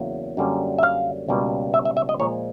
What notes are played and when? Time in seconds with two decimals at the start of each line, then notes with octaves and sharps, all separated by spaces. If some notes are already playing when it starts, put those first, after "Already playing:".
Already playing: E2 C#3 F#3 A#3
0.37 F#2 D3 G3 A#3 C#4
0.78 E5
0.83 F5
1.28 C#2 B2 G3 A#3
1.74 E5
1.85 E5
1.97 E5
2.09 D#5
2.20 A#2 F3 G#3 C#5